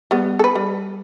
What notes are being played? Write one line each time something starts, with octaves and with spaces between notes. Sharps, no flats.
G3 B3
A4 B4
G3